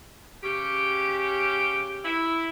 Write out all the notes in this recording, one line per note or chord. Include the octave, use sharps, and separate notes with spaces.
C#3 C#4 G4
E4